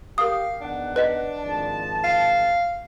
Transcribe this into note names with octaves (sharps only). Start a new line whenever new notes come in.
G4 A#4 F5 D#6
E2 D#3 D4 F#5
B4 D#5 B6
G#1 F3 A5
F5